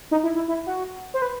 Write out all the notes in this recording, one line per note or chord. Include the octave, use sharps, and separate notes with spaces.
D#4
E4
E4
E4
F#4
C5
B4